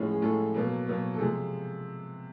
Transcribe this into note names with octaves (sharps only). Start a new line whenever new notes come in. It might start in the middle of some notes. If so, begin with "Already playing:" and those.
Already playing: A2 F3 G#3 C#4
G#4
A2 F3 G#3 C#4 A4
B2 F#3 A#3
B2 F#3 A#3
A4
C3 F3 G#3 G#4